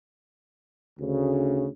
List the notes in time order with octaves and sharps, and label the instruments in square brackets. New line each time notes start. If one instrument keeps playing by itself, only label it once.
[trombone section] D2 C#3